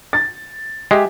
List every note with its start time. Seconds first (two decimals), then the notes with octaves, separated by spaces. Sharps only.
0.13 A6
0.91 G#3 G4 E5 G#5